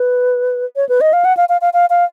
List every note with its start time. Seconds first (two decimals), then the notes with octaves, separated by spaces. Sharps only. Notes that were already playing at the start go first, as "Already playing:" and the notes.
Already playing: B4
0.76 C#5
0.89 B4
1.01 D#5
1.13 F5
1.25 F#5
1.37 F5
1.49 F5
1.61 F5
1.74 F5
1.90 F5